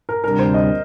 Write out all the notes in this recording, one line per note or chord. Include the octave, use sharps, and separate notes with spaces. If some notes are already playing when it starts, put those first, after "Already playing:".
A#4
D2 C3 G3 D4 A#4
C5
D#5